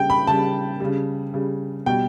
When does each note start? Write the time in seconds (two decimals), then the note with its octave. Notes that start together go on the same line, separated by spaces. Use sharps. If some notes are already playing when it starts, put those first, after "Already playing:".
Already playing: C#3 G3 G5
0.10 B5
0.27 C#3 G3 A5
0.80 C#3 G3
1.34 C#3 G3
1.86 B2 G3 G5